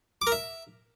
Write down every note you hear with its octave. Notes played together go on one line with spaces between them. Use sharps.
D6
A#4
E5